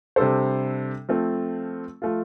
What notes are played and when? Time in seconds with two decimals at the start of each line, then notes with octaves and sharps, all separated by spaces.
0.16 C3 G3 D4 A4 C5
1.09 F3 A3 C4
2.02 F3 A3 F4